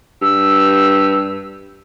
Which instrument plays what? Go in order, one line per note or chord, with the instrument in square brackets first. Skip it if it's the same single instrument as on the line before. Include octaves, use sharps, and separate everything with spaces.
[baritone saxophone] G2 [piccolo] E6